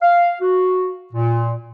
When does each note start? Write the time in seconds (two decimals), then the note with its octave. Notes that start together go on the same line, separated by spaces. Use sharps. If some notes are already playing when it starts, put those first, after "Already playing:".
0.02 F5
0.41 F#4
1.13 A#2